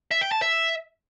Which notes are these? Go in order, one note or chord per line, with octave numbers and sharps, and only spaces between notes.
E5
G5
A5
E5